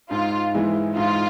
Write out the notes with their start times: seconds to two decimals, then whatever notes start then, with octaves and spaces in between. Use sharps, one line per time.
0.11 G#2 F4
0.54 E3 G#3 E4
0.97 G#2 F4